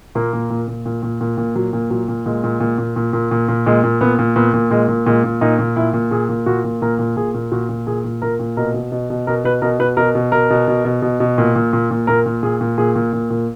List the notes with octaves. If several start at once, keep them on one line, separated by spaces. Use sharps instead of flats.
A#2 A#3
A#2
A#2
A#2
A#2
A#2
A#2
A#2
A#2 F#3
A#2
A#2 F#3
A#2
A#2 G#3
A#2
A#2
A#2
A#2
A#2
A#2
A#2
A#2 G#3
A#2
A#2 B3
A#2
A#2 B3
A#2
A#2 G#3
A#2
A#2 G#3
A#2
A#2 D#4
A#2
A#2 E4
A#2
A#2 G#4
A#2
A#2 F#4
A#2
A#2 A#4
A#2
A#2 G#4
A#2
A#2 F#4
A#2
A#2 G#4
A#2
A#2 A#4
A#2
B2 A#4
B2
B2
B2
B2 A#4
B2 B4
B2 A#4
B2 B4
B2 A#4
B2
B2 A#4
B2
B2
B2
B2
B2
A#2
A#2
A#2
A#2
A#2 A#4
A#2
A#2 G#4
A#2
A#2 G#4
A#2
A#2
A#2